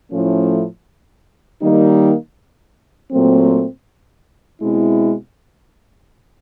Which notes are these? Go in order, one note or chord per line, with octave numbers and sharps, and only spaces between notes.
A2 F3 A3 C#4 E4
D#3 G3 A#3 D#4
A#2 F#3 A3 C4
B2 G#3 C4 E4